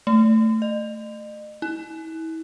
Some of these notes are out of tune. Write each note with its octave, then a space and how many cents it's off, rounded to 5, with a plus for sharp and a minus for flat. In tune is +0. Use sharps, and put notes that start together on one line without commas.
A3 +10
D#5 -40
E4 -35